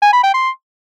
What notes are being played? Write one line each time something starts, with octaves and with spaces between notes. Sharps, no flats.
G#5
B5
G5
C6